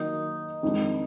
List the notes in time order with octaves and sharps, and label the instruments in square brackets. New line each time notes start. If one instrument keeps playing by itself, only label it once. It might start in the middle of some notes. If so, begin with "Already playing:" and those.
Already playing: [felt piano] D#3 F#3 A#3 [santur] D#4
[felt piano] F2 D#3 G#3 D4